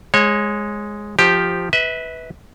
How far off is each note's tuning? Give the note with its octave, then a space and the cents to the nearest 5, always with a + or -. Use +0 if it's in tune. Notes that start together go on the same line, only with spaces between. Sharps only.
G#3 +0 C#5 -25
F3 +0 G4 +0 C5 -5
B4 +0 E5 -35